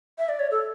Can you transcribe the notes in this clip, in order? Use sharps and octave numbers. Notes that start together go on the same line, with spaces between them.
E5
D5
C#5
A4